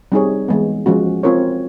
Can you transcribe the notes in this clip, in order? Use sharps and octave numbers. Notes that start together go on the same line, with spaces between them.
G3 C4 D#4 G#4 C#5
E3 G#3 B3
F3 G#3 C#4 F#4
C4 F4 A#4 C#5